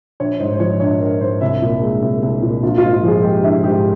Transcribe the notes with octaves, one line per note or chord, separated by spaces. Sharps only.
A#1 C#5
G#2 C5
C5
F3 C#5
A#1 C#5
A#1 A#4
G#2 C5
C2 E5
A#2
G#3
C2
C2
A#2
A#1 F4
F4
G#2
F4
F3 G#4
G#3 G4
A#1 E4
G#2 G4